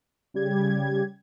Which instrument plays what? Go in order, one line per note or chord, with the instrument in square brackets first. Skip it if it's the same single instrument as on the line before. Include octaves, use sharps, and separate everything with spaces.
[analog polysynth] C#3 G3 G4 G#6